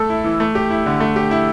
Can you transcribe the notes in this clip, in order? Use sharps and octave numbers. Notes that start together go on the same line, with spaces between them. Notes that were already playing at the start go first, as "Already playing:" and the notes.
Already playing: A3 A4
E4
E3
A3
G4
E4
D3
A3
G4
E4